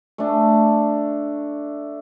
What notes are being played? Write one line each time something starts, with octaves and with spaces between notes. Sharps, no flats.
A3 D4